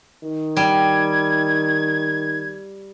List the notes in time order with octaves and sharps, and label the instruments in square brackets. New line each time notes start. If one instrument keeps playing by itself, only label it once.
[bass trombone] D#3
[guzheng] G3 [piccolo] G#6